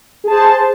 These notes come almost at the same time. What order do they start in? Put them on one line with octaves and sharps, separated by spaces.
G#4 A5 C5